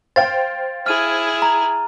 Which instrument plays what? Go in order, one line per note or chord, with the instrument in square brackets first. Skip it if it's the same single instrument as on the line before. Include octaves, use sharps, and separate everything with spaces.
[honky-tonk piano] C5 F5 G5 [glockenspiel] A6
[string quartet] E4 G#4 [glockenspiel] F6 D#7
[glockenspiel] A#5